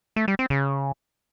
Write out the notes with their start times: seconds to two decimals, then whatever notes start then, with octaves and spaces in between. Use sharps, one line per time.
0.16 A3
0.28 G3
0.39 C4
0.50 C#3